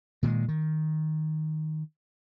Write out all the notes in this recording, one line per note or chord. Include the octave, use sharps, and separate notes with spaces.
A#2 D#3 F3 G#3
D#3